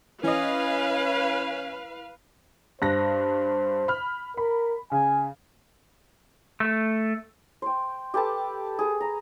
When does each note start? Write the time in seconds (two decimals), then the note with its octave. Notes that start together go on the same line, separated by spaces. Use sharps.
0.23 E3 C#4 B4 D#5 F5
2.82 G2 C5 F#6 A#6
3.88 B5 F6
4.37 A#4 B5
4.92 C#3 G#5
6.60 A3
7.62 C5 G5
8.14 G4 A4 B4 A5
8.79 G#4
9.00 A#5